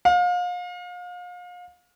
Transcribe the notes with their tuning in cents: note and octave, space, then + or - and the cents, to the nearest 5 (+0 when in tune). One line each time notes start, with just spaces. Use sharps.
F5 +35